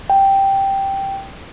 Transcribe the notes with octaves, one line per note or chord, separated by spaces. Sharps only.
G5